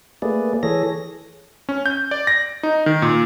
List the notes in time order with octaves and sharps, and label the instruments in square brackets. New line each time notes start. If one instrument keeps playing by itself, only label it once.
[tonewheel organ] A3 A#3 G#4 B4 D5
E3 G#4 A4 C#5 A#6
[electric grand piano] C#4
G6
D5
A#6
D#4
D#3
A#2